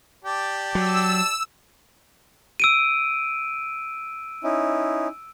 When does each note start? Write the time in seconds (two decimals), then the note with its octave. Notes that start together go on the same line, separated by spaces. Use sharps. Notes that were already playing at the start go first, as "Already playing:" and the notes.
0.24 G4 D5 A5
0.75 F#3 E6
2.60 E6 D7 D#7
4.44 C#4 D#4 E4